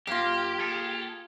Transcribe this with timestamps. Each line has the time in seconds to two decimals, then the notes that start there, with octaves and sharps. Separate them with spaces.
0.07 F#2 A#3 F4 G4 F5
0.58 A#3 G#4 A4